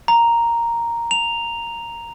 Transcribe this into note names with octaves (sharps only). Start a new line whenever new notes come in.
A#5
F7